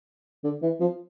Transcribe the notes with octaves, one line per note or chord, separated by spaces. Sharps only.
D3
E3
F3